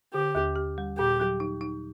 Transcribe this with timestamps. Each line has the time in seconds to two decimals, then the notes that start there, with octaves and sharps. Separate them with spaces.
0.14 D3 G4
0.35 D#2
0.56 G4
0.78 G3
0.98 A#2 G4
1.20 F#3
1.40 D#4
1.61 D#4